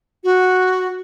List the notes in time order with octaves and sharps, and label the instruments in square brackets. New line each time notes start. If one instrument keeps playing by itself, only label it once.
[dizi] F#4